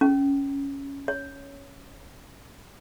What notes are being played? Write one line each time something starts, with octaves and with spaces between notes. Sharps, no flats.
C#4
C#5